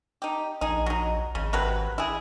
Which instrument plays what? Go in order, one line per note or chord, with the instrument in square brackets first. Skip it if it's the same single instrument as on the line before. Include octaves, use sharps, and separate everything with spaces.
[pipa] D#4 G4
[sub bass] A#1 [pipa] D#4 G#4
[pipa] F#3 D#4
[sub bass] G#1 [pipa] C#3
[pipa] C3 F#3 B4
E4 G#4